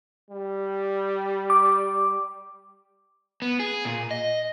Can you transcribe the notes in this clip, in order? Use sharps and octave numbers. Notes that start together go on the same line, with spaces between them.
G3
D6
B3
G#4
A#2
D#5